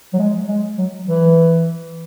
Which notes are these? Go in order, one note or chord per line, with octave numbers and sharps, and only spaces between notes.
F#3
G#3
G#3
F#3
E3